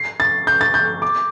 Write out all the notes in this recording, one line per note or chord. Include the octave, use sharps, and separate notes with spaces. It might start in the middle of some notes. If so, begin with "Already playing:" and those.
Already playing: C7
A6
G6
A6
G6
D6